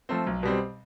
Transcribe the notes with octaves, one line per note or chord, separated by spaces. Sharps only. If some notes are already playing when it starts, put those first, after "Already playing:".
F3 A3 C4
B1
B2 G3 C4